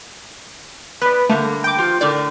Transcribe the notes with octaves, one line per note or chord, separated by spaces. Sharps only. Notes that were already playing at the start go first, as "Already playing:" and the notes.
B3 B4 D5
D3 G3 A3 A#3
G5 D6
F3 F4 G4
A2 D3 A#4 D5